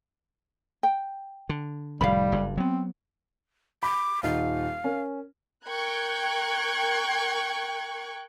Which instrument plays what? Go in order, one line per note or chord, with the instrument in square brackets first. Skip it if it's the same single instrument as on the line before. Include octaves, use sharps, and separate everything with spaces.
[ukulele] G5
[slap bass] D3
[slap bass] F1 A2 D#3 [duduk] G3 [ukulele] F5 B5
[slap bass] F#1 G2
[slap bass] F#3 B3 [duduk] C4
[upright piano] B5 [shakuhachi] D6
[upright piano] D#1 D#4 [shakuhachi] F5
[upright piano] C#4 A#4
[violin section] A#4 G5 C#6 F#6 G#6